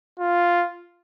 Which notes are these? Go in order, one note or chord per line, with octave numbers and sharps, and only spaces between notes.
F4